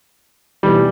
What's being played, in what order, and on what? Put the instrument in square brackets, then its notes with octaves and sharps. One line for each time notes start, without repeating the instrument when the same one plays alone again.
[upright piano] B2 E3 A3 [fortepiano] G3